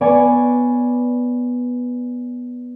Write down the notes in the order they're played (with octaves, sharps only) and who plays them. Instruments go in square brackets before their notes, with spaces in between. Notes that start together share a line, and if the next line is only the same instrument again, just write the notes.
[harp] B3 C#5 D5 G#5